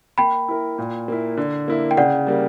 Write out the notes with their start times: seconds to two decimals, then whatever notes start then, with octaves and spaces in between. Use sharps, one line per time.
0.18 A#3 G5 B5
0.48 E4 A#4
0.78 A#2
1.08 A#3 E4
1.37 D3
1.68 A#3 E4
1.91 G5
1.97 C#3 D5 F#5
2.27 G3 A#3